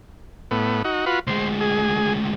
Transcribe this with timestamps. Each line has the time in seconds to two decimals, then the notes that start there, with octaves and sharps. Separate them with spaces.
0.51 A2 B3
0.84 D#4 F#4
1.06 F4 F#4 B4
1.27 D2 G#3 C5
1.60 G#4